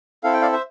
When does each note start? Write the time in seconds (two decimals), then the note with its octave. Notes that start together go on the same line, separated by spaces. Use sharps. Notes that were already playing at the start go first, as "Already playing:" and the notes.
0.24 C4 E4 A4 F5
0.33 G5
0.42 D5 F5
0.53 C5 E5